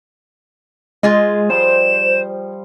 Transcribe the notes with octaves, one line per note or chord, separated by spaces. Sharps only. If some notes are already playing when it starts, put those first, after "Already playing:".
G#3 F4 G#4 D#5
F3 G3 C5 E7